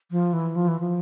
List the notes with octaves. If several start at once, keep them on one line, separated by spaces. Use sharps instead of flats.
F3
E3
F3
E3
F3